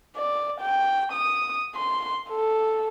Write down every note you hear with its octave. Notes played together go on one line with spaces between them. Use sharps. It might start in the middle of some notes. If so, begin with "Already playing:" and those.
D5
G5
D#6
C6
A4